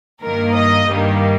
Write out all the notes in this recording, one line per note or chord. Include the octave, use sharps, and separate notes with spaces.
G2 D#3 A#3 A#4
D#5
G2 D#3 G3 A#3